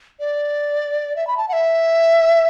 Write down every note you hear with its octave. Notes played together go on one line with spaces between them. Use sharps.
D5
E5
B5
A5
F#5
E5